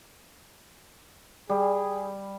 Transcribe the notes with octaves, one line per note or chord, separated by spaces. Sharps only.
G3 G#4